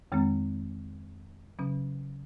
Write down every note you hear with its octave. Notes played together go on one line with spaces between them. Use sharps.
F2 D#3 G#3 C4
C#3 F#3 C#4